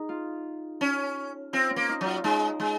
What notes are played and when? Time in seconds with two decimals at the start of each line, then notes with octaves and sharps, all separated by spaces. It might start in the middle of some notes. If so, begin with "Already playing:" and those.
Already playing: D#4 G#4
0.09 F4
0.81 C#4
1.53 C4 F4
1.71 C#4
1.76 A#3
1.89 D#4
2.01 F#3 F4
2.24 G#3 D#4
2.60 G#3